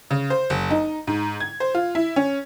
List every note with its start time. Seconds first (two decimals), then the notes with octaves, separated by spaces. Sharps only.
0.11 C#3
0.30 C5
0.50 F#1
0.71 D#4
1.07 G#2
1.40 G#6
1.60 C5
1.75 F4
1.95 E4
2.16 C#4